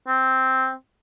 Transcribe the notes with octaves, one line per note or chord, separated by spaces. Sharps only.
C4